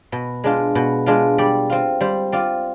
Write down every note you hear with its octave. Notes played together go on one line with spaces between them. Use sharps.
B2
G#3 D4 F4
B2
G#3 D4 F4
G3 D5
C4 F4
G3 C5
C4 F4 D5